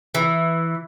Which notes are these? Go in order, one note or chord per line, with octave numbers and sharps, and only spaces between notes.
E3